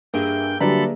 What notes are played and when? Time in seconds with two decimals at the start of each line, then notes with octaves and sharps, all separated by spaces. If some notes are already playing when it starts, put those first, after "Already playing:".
0.14 G2 A#3 G#4 E5 G5
0.60 D3 F#3 G3 A4 B4 D5 A#5 B5